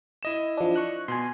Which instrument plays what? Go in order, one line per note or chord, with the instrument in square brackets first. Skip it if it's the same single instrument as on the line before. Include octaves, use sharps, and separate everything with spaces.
[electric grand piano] E4 D#5 E7
[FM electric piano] F3 D4
C#6 F#6
[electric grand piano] B2 [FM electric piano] G#5 C6